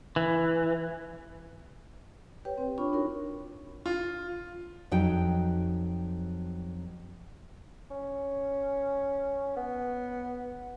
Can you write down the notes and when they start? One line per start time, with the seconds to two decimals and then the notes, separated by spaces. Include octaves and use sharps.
0.16 E3
2.45 G4 B4 C#5 G5
2.58 C4
2.78 D4 F4 C#5 B5 C#6
2.93 D#4 F#4 A#4 C#5
3.86 F4
4.91 F2 F#3 D#4 G5
7.90 C#4
9.56 B3